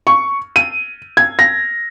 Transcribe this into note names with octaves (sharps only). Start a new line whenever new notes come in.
C#6
D#7
G#6
A#6